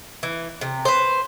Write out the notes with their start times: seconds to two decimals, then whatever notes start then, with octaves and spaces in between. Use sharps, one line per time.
0.23 E3
0.61 C3
0.85 B4 C5